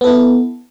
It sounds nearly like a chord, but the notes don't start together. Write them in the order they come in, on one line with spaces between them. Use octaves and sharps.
B3 A4 E4